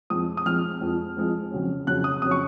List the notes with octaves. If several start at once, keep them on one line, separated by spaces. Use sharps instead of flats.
F2 F3 G#3 D#6
D#6
F2 F3 G#3 F6
F2 F3 G#3
F2 F3 G#3
F2 C#3 F#3 C#4
F2 C#3 F#3 C#4 F#6
D#6
F2 C#3 F#3 C#4 D#6
C#6